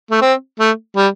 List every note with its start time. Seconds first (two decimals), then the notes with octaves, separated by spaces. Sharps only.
0.11 A3
0.21 C4
0.59 A3
0.96 G3